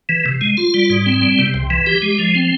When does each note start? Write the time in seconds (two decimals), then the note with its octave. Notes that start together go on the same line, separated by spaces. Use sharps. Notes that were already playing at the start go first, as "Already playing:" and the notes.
0.09 E3
0.26 C3
0.41 G#3
0.57 F4
0.74 G3
0.90 G#2
1.06 C4
1.22 G3
1.39 C3
1.54 C2
1.70 E3
1.87 G4
2.02 G#3
2.18 F3
2.35 C4